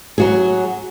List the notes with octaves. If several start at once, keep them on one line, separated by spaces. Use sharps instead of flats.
F#3 F#4 G#4